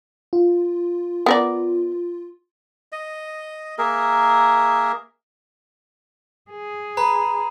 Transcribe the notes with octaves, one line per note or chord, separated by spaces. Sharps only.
F4
B3 A#4 D5
D#5
A#3 G#4 A#4 E5
G#4
B4 A#5